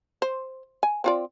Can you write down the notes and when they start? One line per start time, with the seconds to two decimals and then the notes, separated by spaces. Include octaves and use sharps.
0.22 C5
0.83 G#5
1.04 C4 F4 D5